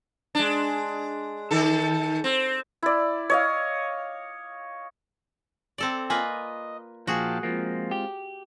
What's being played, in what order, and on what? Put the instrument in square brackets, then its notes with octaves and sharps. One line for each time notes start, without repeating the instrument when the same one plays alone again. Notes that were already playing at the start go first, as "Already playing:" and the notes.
[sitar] G#3 D4
D#3 A4
C4
[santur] E4 D5
C#5 D#5 F5
[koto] C4 A4 D5
[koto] A#3 F4 B4 [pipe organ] D#5 [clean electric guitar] G#5
[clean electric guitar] A#2 F3 [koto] F#4 G#4 [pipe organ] F5 G5 A5
[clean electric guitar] F3 A#3 [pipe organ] G#3 C4 F4
[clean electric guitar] G4